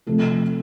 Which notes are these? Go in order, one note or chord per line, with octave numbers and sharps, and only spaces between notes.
C3 F3 A3 A4